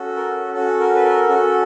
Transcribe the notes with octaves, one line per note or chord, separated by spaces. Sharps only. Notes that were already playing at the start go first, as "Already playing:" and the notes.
Already playing: C#4 F#4 A4
A#4
C#4 F#4 A4
A#4
B4
A#4
C#4 F#4 A4